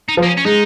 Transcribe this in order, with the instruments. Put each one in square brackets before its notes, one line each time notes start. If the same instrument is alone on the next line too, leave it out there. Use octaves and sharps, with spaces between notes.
[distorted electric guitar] D#4
[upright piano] F3
[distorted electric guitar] A#3
C#4
C#4
[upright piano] G#3 [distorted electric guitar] D#4